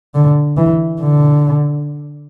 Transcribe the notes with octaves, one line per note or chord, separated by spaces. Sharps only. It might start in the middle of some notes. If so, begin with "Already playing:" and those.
D3
E3
D3